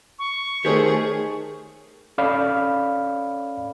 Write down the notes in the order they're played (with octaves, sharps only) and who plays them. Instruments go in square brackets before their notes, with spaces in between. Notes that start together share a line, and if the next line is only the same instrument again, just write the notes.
[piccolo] C#6
[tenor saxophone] D#3 [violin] A3 G#4 [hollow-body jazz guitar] G4 C5 C#5
[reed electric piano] C#4 A4 C#5 D5 F5 B5